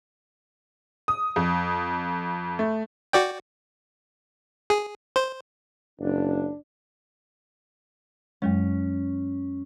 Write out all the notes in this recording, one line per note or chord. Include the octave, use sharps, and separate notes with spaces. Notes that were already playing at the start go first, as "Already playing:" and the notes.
D#6
F2
A3
F#4 D5 G5
G#4
C5
F#1 D4
F#2 F#3 G#3 C#4